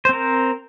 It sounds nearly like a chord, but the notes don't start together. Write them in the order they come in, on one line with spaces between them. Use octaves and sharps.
C5 C4 A#4